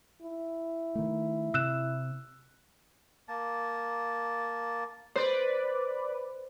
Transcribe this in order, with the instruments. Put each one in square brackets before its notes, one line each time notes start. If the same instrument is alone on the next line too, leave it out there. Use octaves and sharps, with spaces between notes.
[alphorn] E4
[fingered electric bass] D#3 A3
[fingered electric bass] C3 [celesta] E6 F#6 E7
[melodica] A#3 A5
[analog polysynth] B4 D5 [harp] C5